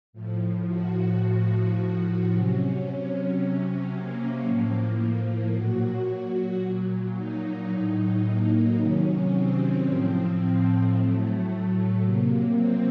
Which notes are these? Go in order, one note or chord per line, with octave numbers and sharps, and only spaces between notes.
A2 F3
F#4
A2 F3
C3 F#3 C#4
C3 F#3
A#3
A2 F3
A#3
A#2 F#3 F#4
A#2 F#3
D#4
A2 F#3
A#3
C3 D#3 F#3 C#4
C4
A2 F3 C4
A2 F#3 A3
C3 F#3 A#3
C4